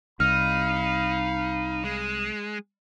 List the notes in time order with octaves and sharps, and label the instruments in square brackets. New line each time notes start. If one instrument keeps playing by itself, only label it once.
[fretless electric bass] C2 [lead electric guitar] D#4 [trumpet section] F5 B5 [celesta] F6
[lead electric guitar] G#3